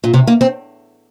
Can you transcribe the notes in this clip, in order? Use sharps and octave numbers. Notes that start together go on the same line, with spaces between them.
A#2
C3
A#3
C4